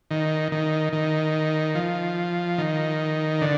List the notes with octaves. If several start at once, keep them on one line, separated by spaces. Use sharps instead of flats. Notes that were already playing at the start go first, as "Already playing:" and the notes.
D#3
D#3
D#3
F3
D#3
D3